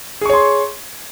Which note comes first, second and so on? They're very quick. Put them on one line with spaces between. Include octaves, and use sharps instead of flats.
G#4 C#6 C#5 C6